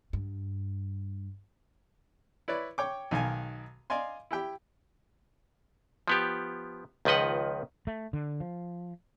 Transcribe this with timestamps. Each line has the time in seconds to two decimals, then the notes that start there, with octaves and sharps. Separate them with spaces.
0.13 G2
2.48 E4 B4 C#5 D5
2.78 C#5 G5 D6
3.11 B1 D#3 F5 G#5
3.90 D5 D#5 F5 G#5 C6
4.31 E4 G4 G5
6.08 F3 B3 G4
7.05 C#2 D#3 F3 B4 D#5 F#5
7.87 A3
8.13 D3
8.40 F3